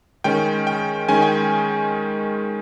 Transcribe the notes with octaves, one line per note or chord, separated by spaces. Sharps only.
D#3 G#3 C#4 G5
G5
D#3 G#3 C#4 G#5
G5